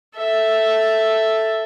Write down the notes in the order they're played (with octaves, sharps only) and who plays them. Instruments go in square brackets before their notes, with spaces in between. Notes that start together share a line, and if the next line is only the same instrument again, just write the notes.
[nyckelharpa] A4 E5